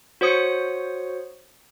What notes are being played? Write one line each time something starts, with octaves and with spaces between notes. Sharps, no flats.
F#4 C5 C#5 D#6 C#7